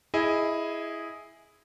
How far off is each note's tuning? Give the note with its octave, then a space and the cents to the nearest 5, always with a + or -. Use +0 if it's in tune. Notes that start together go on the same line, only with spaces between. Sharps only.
E4 +0 G#4 +0 D#5 +15